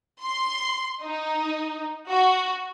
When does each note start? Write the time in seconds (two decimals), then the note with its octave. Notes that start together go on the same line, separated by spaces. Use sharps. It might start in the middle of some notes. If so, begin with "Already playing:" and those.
0.22 C6
1.04 D#4
2.08 F#4